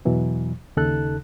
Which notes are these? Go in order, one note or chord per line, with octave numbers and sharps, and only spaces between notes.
E2 B2 E3 F#3
D#2 C#3 D#4 A4 A5 F#6